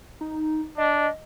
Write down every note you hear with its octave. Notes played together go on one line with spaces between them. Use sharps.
D#4
D4 D#5